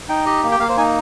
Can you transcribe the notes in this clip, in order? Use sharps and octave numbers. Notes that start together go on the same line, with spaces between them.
D#4 G5
G4 D#5
A#3
G5
A#3 F5
C5
D#4 G#5